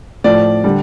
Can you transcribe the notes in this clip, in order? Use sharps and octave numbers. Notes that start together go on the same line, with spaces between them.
A2 F3 D5
D3 G3